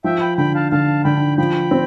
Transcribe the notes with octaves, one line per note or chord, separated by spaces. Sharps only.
F3 E5 G5
G5 B5
D3 G5 B5
F5 A5
D3 F5 A5
D3 G5 B5
F3 G5 B5
C4